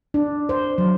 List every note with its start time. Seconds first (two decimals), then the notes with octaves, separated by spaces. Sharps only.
0.14 D4
0.49 C5
0.78 F#3